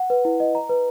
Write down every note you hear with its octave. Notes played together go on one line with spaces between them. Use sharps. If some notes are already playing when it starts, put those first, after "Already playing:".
Already playing: F#5
B4
E4
D#5
A#5
B4